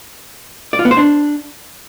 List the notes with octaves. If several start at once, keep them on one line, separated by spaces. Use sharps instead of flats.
D5
F4
B3
C5
D4